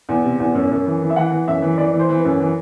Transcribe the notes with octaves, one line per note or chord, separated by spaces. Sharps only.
E2
C3
E2
F#2
F#2
E3
E3
E5
E3 F#5
E3
F#2 E5
E3
E3 D5
E3
C5
E3
B4
F#2
E3